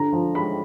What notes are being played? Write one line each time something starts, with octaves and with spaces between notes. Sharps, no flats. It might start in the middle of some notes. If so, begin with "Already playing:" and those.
Already playing: D3 A#5
F3
G#3 B5